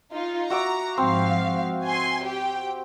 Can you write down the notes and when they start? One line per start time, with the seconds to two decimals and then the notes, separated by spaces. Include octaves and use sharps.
0.12 D#4 F4
0.50 F#4 E5 A#5 D6
0.97 G#2 F3 C4 F5
1.84 G#5 C6
2.24 G4 G5